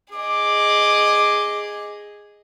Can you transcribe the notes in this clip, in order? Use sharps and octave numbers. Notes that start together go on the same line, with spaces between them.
G#4 D#5 D6